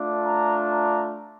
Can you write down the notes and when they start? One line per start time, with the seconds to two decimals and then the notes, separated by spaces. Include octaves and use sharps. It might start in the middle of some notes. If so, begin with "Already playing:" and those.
Already playing: A3 D4 F4
0.24 A#5
0.70 A#5